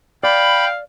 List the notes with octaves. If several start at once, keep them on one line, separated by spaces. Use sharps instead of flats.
D5 F5 G5 B5